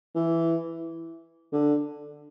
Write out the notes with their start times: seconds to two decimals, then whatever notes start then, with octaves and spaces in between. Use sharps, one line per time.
0.15 E3
1.53 D3